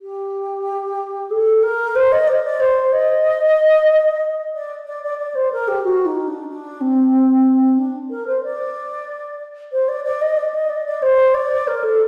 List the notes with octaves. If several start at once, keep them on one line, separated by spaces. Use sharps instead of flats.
G4
A4
A#4
C5
D#5
D5
D5
C5
D#5
D5
D5
D5
D5
C5
A#4
G4
F#4
D#4
D4
D4
C4
D4
A#4
C5
D5
C5
D5
D5
D#5
D5
D#5
D5
D5
C5
D5
A#4
A4